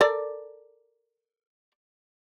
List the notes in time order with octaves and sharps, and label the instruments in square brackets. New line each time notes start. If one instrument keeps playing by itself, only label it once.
[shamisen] A4 A#4 D5